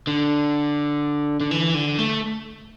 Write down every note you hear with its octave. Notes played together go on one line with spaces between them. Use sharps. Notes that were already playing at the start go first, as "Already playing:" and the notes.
D3
D3
E3
D3
A3